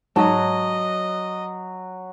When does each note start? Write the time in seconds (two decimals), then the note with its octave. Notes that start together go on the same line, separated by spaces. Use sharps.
0.16 G#2 F#3 C#5 D#5 A5